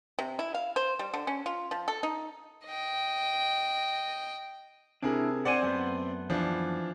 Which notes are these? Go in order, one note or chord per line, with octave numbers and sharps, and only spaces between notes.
C3
E4
F5
C5
G3
D3
C#4
F4
F3
A4
D#4
D#5 G5
C3 D4 E4 G#4 A#4
C4 C5 D5 F#5 G#5
F#2 A3 B3
E3 F3 D4